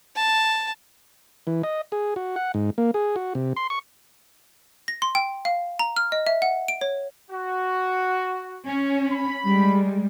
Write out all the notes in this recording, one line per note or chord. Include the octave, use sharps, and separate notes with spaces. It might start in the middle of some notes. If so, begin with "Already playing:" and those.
A5
E3
D#5
G#4
F#4
F#5
G#2
A#3
G#4
F#4
C3
C6
C#6
A#6
C6
G5
F5
A#5
F6
D#5
E5
F#5
D7
C#5
F#4
C#4
B5
G3 G#3